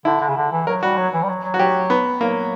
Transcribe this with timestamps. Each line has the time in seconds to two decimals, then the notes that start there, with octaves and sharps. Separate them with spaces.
0.05 D3 E4
0.20 D3
0.29 C#3
0.37 D3
0.52 E3
0.67 F#3 A#4
0.83 G3 F#4
0.97 F#3
1.14 E3
1.23 G3
1.29 F#3
1.43 F#3
1.54 F#4
1.59 F#3 G4
1.90 B3
2.20 F#3 A#3